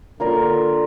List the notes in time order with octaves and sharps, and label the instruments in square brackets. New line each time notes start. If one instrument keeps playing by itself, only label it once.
[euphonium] D3 [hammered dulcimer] A#3 F4 A#4 D5